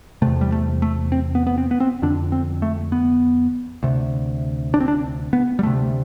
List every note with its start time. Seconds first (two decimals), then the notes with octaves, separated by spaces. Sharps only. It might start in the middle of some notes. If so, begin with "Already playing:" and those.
0.22 C3 A3
0.26 E2
0.41 G3
0.52 A3
0.82 A3
1.12 C4
1.35 B3
1.47 B3
1.58 C4
1.71 B3
1.80 C4
2.02 F2 D3 D4
2.32 C4
2.62 A3
2.92 B3
3.83 D2 C3
4.74 D4
4.80 C4
4.88 D4
5.33 B3
5.59 G3
5.63 D2 C3 A3